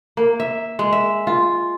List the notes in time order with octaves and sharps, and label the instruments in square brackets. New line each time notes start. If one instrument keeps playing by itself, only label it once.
[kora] A#3
E5
G#3
E5
F4